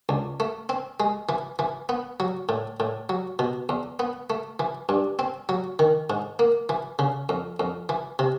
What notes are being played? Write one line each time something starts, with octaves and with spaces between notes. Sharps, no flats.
C#2
A3
C4
G#3
E3
E3
B3
F#3
A2
A2
F#3
B2
E2
B3
A3
E3
G2
C4
F#3
D#3
G#2
A#3
E3
C#3
F2
F2
E3
C3